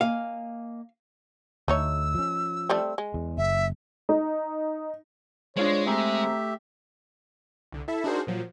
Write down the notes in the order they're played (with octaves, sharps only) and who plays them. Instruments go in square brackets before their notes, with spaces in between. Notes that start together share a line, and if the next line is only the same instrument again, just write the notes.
[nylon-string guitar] A#3 D#5 G#5 [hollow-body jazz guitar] F5
[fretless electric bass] D2 [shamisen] A3 D#4 C#5 [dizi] E6
[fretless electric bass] F3 C#4
[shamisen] G3 A3 C4
G#3
[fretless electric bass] E2
[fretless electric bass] F#1 [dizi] E5
[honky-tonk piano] D#4
[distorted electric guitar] G#3 [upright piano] D4 F4 C5 [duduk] C#5
[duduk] A3 [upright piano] C4 G#4 A#5 [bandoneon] G4 E5
[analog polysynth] C2 D3
E4 A4 E5
D4 D#4 F#4 G#4 A#4 C5
A#2 F3 F#3